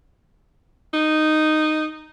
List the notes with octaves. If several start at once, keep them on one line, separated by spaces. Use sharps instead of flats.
D#4